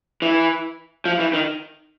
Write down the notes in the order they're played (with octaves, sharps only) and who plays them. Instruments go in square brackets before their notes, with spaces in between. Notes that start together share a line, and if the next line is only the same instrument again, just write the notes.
[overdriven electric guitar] E3
F3
E3
D#3